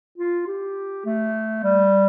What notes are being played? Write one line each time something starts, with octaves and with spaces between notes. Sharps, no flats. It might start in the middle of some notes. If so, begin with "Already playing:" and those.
F4
G4
A3
G3